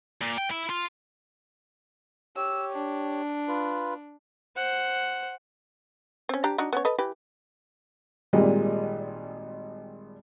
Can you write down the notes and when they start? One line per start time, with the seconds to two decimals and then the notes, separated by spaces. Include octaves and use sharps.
0.22 A#2
0.38 G5
0.51 E4
0.70 F4
2.36 G4 C#5 E6
2.73 D4
3.48 F4 B4
4.56 C5 F#5
6.29 C4 C#4
6.44 D4 G4 A#5
6.58 D4 D#4 F#4
6.73 B3 C#4 C#5
6.85 A4 B4 D#5
6.98 E3 G4 B4
8.33 G#1 A#2 G3 G#3 D#5